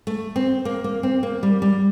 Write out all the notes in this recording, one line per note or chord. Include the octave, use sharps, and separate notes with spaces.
A3
C4
A#3
A#3
C4
A#3
G3
G3